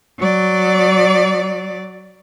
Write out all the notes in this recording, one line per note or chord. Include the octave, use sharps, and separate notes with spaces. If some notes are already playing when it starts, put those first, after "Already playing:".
F#3 D5